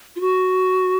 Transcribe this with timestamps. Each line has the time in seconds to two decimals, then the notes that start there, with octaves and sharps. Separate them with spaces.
0.16 F4
0.20 F#4